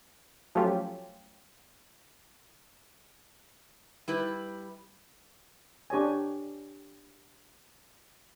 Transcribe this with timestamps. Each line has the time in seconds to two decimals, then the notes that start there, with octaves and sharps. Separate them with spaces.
0.55 F3 F#3 A3 C#4 F4 G4
4.08 G3 E4 B4
5.90 D4 G4 C#5 G#5